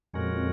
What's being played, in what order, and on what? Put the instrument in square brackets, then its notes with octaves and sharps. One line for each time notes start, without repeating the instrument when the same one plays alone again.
[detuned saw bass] F2 [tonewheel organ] A#2 G#3 C#4 F#4 A#4